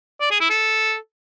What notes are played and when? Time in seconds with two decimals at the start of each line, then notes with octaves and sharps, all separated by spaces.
0.21 D5
0.31 G#4
0.40 E4
0.50 A4